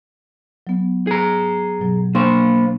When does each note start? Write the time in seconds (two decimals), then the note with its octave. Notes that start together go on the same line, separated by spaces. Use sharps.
0.67 F#3 B3
1.07 G#4 A#5
1.78 G2 B2 F#3
2.15 A#3 D4 C5 C6 C#6